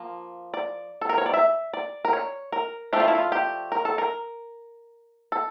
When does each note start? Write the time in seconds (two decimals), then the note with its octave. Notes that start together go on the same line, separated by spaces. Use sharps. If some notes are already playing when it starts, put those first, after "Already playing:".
Already playing: F3 A#3
0.54 D5
1.01 A4
1.09 A#4
1.18 C#5
1.26 D5
1.34 E5
1.73 D5
2.05 A#4
2.13 C#5
2.52 A#4
2.93 F3 A3 D4 G4
3.00 F4
3.08 E4
3.15 F4
3.32 G4
3.72 A#4
3.85 A4
3.98 A#4
5.32 A4